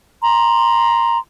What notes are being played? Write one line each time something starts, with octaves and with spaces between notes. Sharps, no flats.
A#5 C6